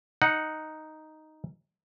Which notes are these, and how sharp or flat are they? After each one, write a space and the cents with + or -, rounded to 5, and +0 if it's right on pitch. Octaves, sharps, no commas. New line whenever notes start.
D#4 +0 F#5 +0